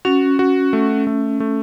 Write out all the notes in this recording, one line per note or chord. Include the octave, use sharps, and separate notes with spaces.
C#4 F#4
F#4
A3
A3
A3